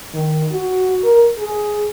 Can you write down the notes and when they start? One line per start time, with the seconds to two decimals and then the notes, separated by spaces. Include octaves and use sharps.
0.14 D#3
0.52 F#4
1.04 A#4
1.39 G#4